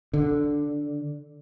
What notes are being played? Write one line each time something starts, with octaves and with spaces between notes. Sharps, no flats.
D3